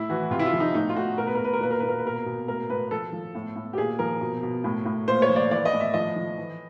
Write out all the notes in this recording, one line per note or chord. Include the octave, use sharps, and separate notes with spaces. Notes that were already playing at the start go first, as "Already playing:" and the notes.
Already playing: A2 E4
E3 F#4
C3 F4
E4
F4
F3
D#4
A2 D#4
F4
A2 F#4
B2 A#4
B4
B2 A#4
B4
A#4
A#2 B4
A#4
A#2 B4
A#4
B4
B2 A#4
B2
A2 A#4
A2 B4
F3 A4
F3
A2
A2
G4
A#2 G#4
F3 A#4
B2
B2
A2
A2
A#2 C5
C#5
F3
D5
E3 D5
D#5
A2
E5
F3 D#5
F3
E3